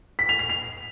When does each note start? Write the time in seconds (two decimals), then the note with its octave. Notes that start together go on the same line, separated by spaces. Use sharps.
0.19 B6
0.29 F7
0.39 F7
0.49 F7